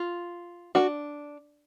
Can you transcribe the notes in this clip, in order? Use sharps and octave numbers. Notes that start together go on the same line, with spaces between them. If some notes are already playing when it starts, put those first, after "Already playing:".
Already playing: F4
A#3 D4 F#4